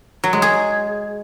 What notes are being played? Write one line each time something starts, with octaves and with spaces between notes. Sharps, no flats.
F#3
G#3
G#4